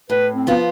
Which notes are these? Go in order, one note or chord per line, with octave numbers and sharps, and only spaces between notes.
A2 B4
C4
F3 B3 F4